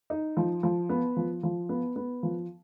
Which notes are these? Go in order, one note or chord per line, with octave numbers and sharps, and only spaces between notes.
D#4
F3
F3
B3
F3
F3
B3
B3
F3